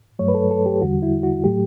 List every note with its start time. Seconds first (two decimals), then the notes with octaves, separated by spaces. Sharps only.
0.19 G2 F#3 A3 C#5
0.28 B4
0.34 A4
0.51 A4
0.66 G4
0.82 E2 D3 G3 F#4
1.02 E4
1.23 F#4
1.44 A2 F#3 A3 G4